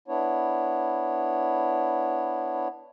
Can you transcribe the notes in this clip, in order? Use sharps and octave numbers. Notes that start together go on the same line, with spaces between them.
B3 D4 E4 C#5